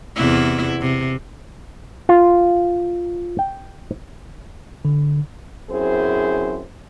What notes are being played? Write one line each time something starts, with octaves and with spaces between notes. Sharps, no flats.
E2 C3 E4
C3
F4
G5
D3
F#2 C4 E4 G#4 C5